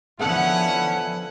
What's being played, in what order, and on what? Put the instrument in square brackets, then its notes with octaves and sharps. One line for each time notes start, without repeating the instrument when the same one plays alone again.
[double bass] D3 F3 [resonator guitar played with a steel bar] A3 B3 A4 [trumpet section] C#4 E4 F#5